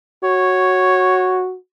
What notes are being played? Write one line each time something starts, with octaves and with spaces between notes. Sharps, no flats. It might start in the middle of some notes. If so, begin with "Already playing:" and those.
F#4 C#5